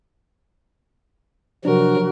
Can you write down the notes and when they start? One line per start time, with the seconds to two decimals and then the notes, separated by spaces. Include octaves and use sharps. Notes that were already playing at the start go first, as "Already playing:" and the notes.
1.65 C3 F3 F#3 D4 F#4 A#4